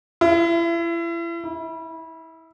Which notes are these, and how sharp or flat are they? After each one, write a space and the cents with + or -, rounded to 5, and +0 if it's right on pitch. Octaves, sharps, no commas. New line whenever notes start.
E4 +35
E4 -25